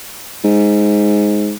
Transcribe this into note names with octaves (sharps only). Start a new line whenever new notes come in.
G#2